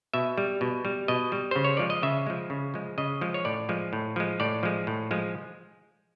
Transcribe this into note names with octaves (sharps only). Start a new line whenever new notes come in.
B2 E5
G3
B2
G3
B2 D#5
G3
C#3 C5
C#5
F3 G#3 D5
D#5
C#3 E5
F3 G#3
C#3
F3 G#3
C#3 D#5
F3 G#3
C#5
A2 D5
F3 G#3
A2
F3 G#3
A2 D5
F3 G#3
A2
F3 G#3